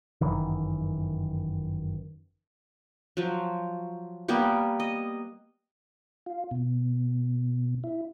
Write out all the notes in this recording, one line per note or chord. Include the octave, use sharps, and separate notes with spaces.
G1 F#2 D#3 E3
F3 F#3
G3 A#3 B3 G4
D#5
F4
B2
E4